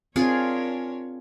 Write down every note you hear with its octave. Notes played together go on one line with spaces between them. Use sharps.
C4 D4 F4 G#4 A#4 C#5